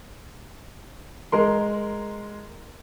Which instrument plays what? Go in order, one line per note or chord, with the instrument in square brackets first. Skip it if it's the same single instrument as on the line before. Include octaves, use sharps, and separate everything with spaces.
[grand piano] G#3 A#4 C6